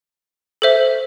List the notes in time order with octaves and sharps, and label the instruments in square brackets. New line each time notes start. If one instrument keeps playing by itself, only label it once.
[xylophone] A4 C5 E5